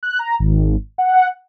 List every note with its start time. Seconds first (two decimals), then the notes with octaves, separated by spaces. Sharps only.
0.03 F#6
0.19 A#5
0.39 G#1
0.98 F#5